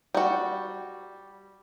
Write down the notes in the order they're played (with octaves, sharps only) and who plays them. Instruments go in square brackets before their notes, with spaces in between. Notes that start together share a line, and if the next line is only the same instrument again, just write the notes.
[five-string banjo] G3 F#4